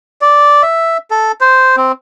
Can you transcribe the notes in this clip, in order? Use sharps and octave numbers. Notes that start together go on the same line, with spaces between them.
D5
E5
A4
C5
C4